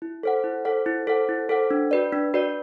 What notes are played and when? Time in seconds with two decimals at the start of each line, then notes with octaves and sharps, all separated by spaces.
0.02 E4
0.23 A4 C5 F#5
0.44 E4
0.65 A4 C5 F#5
0.86 E4
1.07 A4 C5 F#5
1.29 E4
1.49 A4 C5 F#5
1.71 D4
1.91 F#4 B4 D5
2.13 D4
2.34 F#4 B4 D5